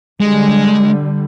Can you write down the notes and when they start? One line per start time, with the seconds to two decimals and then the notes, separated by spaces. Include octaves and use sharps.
0.20 D3 G3 G#3